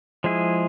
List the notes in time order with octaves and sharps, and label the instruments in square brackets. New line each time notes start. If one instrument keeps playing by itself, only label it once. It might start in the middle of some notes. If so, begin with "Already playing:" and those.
[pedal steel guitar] F3 G#3 E4 G#4